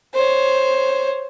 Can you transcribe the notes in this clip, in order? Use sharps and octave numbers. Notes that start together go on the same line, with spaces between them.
C5 C#5